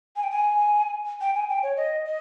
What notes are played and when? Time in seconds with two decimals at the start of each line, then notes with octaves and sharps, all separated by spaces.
0.16 G#5
0.23 G5
0.31 G#5
1.21 G5
1.35 G#5
1.49 G5
1.63 C#5
1.77 D#5
2.05 D#5